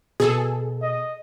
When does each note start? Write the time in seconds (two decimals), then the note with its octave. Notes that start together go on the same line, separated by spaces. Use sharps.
0.20 B2 G#4 A4
0.82 D#5